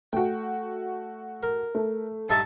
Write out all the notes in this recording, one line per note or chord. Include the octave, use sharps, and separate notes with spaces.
A3 F#4 G5
A#4
A3
G2 D#4 E5 A5